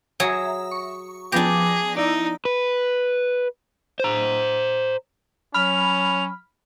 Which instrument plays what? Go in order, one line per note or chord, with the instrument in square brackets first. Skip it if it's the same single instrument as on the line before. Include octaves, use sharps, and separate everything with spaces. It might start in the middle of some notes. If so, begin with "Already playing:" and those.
[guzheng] F#3 G#4 [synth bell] E5 A#5
[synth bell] C#6
[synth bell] F3 B3 A#6 [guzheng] D4 G4 [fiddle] G#4
[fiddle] D#4 [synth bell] E4 D5
[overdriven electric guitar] B4
C5 A#5
[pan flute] F#3 [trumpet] C#4 [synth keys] B5 F6 [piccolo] F7